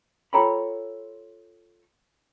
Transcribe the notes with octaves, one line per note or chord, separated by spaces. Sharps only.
F4 A4 C#5 G5 A#5 B5